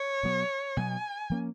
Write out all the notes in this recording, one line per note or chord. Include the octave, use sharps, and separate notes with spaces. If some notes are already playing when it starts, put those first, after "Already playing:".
Already playing: C#5
B2 F#3 B3
B2 F#3 B3 G#5
F3 A#3 C#4